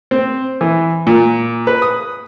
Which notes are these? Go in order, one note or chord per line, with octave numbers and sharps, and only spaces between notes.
C4
E3
A#2
B4
D#6